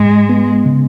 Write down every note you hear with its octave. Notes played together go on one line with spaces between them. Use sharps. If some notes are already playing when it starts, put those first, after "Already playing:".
Already playing: G#2 G#3
B3
C#3